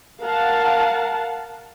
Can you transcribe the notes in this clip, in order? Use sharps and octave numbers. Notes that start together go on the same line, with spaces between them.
A#4 F5 F#5 A5